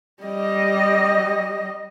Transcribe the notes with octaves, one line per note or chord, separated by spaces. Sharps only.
G3 D#5